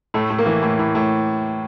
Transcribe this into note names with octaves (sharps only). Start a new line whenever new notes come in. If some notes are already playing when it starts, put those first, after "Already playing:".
A2 A3
A2
A#3
E3
A2
A2
A2